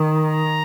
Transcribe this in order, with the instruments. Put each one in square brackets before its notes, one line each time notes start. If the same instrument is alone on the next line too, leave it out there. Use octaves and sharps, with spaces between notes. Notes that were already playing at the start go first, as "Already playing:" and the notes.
Already playing: [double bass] D#3
[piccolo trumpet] A#5